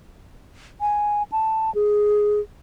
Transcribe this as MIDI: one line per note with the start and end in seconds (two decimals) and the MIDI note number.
0.81 1.23 80
1.32 1.73 81
1.75 2.40 68